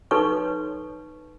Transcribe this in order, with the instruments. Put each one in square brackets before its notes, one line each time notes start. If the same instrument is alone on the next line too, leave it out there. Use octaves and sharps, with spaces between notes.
[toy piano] D#4 A4 B4 C#5 C6 C#6